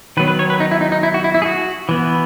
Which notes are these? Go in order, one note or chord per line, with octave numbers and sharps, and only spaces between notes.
D#3 F#3 B3 B4
B4
C#5
B4
D#4
E4
D#4
D#4
E4
F#4
E4
E4
G#4
F#4
E3 B3